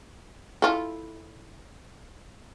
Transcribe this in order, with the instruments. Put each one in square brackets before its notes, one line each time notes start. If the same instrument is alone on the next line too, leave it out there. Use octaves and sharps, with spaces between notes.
[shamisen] E4 F4 A4